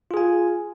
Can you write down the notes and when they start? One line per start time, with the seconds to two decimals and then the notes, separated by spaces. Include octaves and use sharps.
0.11 F4
0.14 G#4
0.17 G#5